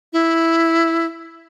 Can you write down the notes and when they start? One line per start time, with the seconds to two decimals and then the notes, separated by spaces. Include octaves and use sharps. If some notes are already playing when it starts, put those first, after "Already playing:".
0.13 E4